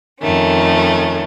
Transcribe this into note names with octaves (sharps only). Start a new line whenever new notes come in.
F2 D#3 A3 C#4